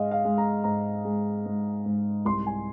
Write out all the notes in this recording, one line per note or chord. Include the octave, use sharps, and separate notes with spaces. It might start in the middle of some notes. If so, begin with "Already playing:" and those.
Already playing: G#2 G#3 D#5 F5
F5
G#3
A#5
G#2 A#5
G#3
G#2
G#2
C2 C6
G#5